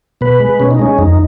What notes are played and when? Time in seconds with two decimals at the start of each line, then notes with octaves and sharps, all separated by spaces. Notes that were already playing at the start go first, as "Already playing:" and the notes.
0.21 B2 B4
0.40 G#3
0.60 B2 C#4
0.71 D#4
0.79 G#3 C#4
0.98 F2 D#4